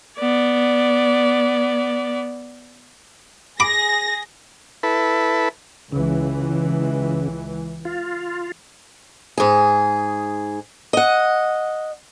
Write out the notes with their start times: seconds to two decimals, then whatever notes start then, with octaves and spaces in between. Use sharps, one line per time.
0.18 B3 D5
3.60 G#4 B5 D6 A#6
4.83 E4 A4 B4
5.92 C#2 C#3 E3
7.85 F4
9.38 G#2 G#4
10.93 D#5 F#5